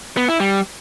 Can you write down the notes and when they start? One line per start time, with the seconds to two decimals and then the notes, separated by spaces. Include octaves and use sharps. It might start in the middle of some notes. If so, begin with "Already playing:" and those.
0.17 B3
0.28 E4
0.40 G3